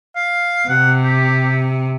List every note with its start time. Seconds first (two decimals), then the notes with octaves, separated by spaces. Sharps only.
0.16 F5
0.69 C3 F#5
1.04 G4